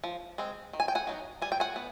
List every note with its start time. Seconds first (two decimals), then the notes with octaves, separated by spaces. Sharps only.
0.04 F3
0.38 G#3 C4
0.73 D#3
0.80 G#5
0.88 G5
0.95 F#5 G#5
1.07 F#3 B3 D#4
1.42 G3 G#5
1.52 G5
1.60 F#5 G#5
1.76 B3